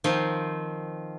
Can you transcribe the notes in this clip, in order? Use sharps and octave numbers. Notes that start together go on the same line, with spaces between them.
D#3 F3 C4